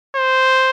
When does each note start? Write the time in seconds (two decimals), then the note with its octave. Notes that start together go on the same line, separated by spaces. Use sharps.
0.16 C5